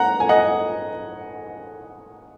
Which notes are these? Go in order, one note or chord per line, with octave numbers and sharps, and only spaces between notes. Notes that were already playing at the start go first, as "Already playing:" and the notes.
Already playing: F#5 A#5
G#5
D#5 F#5